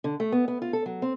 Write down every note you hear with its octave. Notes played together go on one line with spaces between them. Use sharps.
D3
A3
B3
B3
F4
A4
F#3
C4